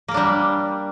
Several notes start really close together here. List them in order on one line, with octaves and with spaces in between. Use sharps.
A#3 A#4 D4 G3